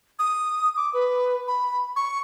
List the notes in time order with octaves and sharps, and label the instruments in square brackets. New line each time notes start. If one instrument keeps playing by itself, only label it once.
[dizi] D#6
D6
B4
B5
C#6